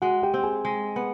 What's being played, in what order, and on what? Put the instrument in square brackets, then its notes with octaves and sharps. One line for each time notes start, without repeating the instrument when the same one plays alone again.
[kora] G#3 [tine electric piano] F#4 F#5
[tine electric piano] G4 G5
[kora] C4
[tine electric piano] G#4 G#5
[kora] G#3
B3